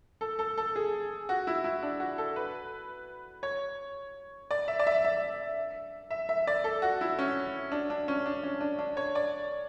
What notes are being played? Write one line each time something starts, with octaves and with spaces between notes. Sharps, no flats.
A4
A4
A4
G#4
F#4
E4
E4
D4
F#4
A4
B4
C#5
D5
E5
D5
E5
E5
E5
E5
D5
A4
F#4
E4
C#4
D4
D4
C#4
D4
C#4
D4
D4
C#5
D5